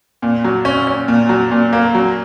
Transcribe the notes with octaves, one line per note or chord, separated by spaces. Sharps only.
A#2
F#3
C#4
C#4
A#2
F#3
A#2
A#3
F#3